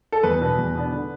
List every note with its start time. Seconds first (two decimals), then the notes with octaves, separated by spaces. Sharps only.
0.12 A4
0.23 E2 B4
0.41 B2 B3 D4
0.58 E2
0.74 B2 B3 D4
0.92 D3